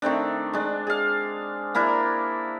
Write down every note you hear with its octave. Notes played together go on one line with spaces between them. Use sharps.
D#3 A3 C4 D4
G#3 D4
G#4 F5
A#3 D4 E4 A#4